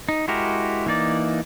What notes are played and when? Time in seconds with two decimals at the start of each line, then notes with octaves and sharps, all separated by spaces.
0.09 D#4
0.28 G#3 E4 F#4 G4 A#4
0.86 E3 A#3 D#4 D5